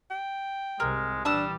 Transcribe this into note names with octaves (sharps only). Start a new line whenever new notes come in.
G5
C2 G#2 C3 G#3 A#4
A#2 E3 G3 D4 A5 D#6 E6